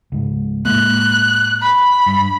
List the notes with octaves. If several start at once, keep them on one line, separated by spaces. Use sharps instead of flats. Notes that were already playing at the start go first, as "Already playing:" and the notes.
C#2 G#2
A2 G#3 A#3 F#6
B5
G2